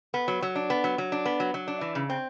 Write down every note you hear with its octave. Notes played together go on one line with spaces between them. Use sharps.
B3
F#3
F#3
D4
B3
F#3
F#3
D4
B3
F#3
F#3
D4
E3
C#3
C4